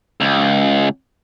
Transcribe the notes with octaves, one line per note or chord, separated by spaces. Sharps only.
C#2